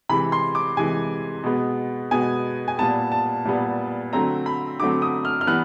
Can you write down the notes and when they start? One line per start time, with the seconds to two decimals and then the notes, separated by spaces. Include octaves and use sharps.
0.09 C3 E3 G#3 B5
0.32 C6
0.55 D6
0.77 C3 E3 G#3 G#5
1.44 B2 G#3 B3
2.11 B2 G#3 B3 G#5
2.68 G#5
2.79 A#2 G3 B3 A5
3.12 A5
3.45 A#2 G3 B3
4.13 D3 F#3 A3 C4 A#5
4.46 B5
4.80 D3 F#3 A3 C4 D6
5.02 D#6
5.25 F6
5.41 F6
5.47 E3 G3 B3 F#6